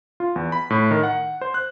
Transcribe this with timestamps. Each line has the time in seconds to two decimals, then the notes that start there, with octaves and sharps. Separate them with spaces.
0.20 F4
0.36 E2
0.52 B5
0.70 A2
0.91 D#3
1.03 F#5
1.41 C5
1.54 F#6